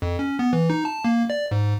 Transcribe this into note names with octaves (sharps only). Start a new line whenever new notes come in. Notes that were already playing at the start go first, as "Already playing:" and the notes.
F2
C#4
B3
E3
D#4
A5
A#3
D5
G#2